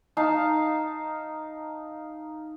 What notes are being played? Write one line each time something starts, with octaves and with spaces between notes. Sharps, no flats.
D#4 F5 A5